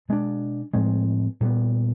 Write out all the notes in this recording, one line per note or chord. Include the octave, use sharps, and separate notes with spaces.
B2 G#3 B3 D4
A2 F3 G#3 C4
A#2 G3 B3